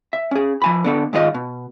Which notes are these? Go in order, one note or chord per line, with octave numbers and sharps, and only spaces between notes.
E5
C#4 G#4
F3 G#5 B5
D3 B3 A4
G#2 D#3 F4 G#4 D#5
B2